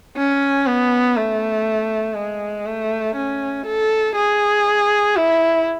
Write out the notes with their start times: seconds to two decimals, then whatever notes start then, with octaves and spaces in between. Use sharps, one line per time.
0.17 C#4
0.67 B3
1.16 A3
2.16 G#3
2.66 A3
3.16 C#4
3.66 A4
4.16 G#4
5.16 E4